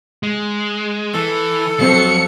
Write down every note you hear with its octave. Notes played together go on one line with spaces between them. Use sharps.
G#3
E3 A4
F2 F#3 C4 C5 C#7